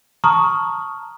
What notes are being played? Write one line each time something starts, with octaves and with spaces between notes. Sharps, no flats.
A5 A#5 C#6 D#6 F6